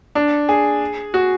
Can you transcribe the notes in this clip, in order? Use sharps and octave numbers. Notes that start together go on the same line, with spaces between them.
D4
G#4
F#4